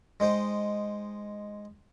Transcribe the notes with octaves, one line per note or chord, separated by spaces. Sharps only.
G#3 D#4 C5 G5